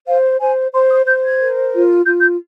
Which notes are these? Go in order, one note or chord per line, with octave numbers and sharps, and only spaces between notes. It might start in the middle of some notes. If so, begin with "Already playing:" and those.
C5 F5
C5 G#5
C5 C6
D#6
C5 G6
G#6
A#4
F4
F4 G6
G6